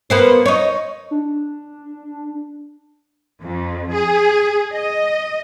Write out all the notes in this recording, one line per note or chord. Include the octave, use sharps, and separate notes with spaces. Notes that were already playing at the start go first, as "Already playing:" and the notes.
A#3 B3 C5
D#4 C#5
D4
F2
G#4
D#5